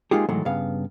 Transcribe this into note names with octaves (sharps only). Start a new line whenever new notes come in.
G#3 A#3 D#4 F4 G4 G#4
A2 D#3 E3 F#3 G#3 A3
G2 C#3 B3 F5